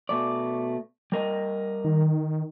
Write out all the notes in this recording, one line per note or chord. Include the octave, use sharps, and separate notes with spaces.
B2 A3 D5
G3 A#4 D#5
D#3